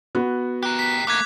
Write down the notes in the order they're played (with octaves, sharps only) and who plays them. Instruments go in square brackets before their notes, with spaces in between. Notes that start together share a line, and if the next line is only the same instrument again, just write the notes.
[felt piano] B3 F#4
[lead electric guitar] G4 A#4 [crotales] F#6
[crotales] B6
[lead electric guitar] A3 A#3 [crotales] D6 F#6 G#6